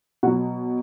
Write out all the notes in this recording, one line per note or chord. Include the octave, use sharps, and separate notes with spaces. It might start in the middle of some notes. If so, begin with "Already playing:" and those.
B2 F#3 F#4